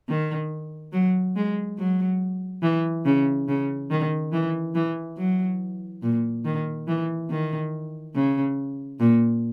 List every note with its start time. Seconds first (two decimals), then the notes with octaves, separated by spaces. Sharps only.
0.09 D#3
0.93 F#3
1.36 G#3
1.78 F#3
2.63 E3
3.05 C#3
3.48 C#3
3.91 D#3
4.32 E3
4.75 E3
5.17 F#3
6.02 A#2
6.45 D#3
6.88 E3
7.30 D#3
8.15 C#3
9.00 A#2